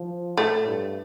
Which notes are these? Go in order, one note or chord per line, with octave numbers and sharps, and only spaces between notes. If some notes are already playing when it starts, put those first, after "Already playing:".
Already playing: F3
A2 A3
G2